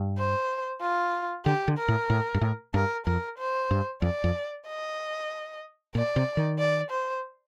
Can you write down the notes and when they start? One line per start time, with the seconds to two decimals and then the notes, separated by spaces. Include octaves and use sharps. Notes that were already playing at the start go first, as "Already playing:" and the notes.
Already playing: G2
0.18 C5
0.82 F4
1.45 D3 G4
1.68 D3
1.78 A#4
1.88 A2
2.10 A2
2.34 G2
2.41 A2
2.74 G2 A#4
3.06 F2 A#4
3.39 C5
3.71 G2
4.02 F2 D5
4.24 F2
4.67 D#5
5.95 A#2 D5
6.16 C3
6.37 D#3
6.59 D5
6.91 C5